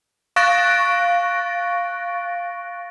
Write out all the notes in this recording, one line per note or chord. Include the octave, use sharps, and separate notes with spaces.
F5 C#6 F#6 A6 A#6 D7